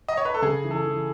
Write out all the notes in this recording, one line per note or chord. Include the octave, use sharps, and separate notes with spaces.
D#5
C#5
B4
A4
C#3 G#4
E3
A4
E3